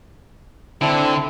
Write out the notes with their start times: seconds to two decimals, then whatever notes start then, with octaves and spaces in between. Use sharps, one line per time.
0.81 D3 C4 D4 E4